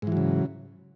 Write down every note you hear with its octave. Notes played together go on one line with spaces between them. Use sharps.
G#2 C#3 E3 F#3